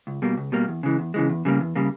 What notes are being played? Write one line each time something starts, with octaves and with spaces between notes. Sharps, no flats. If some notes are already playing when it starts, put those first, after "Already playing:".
C#2
B2 G3 A#3
C#2
B2 G3 A#3
E2
C#3 E3 G#3
E2
C#3 E3 G#3
E2
C#3 G3 A#3
E2
C#3 G3 A#3